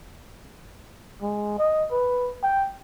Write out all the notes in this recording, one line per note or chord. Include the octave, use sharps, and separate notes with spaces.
G#3
D#5
B4
G5